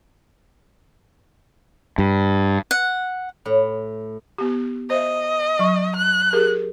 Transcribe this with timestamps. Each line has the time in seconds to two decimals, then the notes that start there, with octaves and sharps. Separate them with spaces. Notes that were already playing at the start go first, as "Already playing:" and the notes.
1.98 G2
2.71 F#5
3.46 A2
4.38 B3 G4
4.90 C5 D#5 E5
5.59 F#3 C#6
5.96 F#6
6.33 G4 G#4 A#4